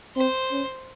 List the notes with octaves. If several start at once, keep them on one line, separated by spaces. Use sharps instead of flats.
C4 C5
C#4